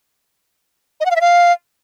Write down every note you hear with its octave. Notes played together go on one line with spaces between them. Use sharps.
D#5
F#5
F5
E5
F5